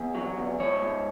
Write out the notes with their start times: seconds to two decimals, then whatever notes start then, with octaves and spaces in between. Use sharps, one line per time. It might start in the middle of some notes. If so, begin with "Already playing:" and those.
Already playing: E2
0.15 F#3
0.38 E2
0.60 G#2 C#5
0.82 G#2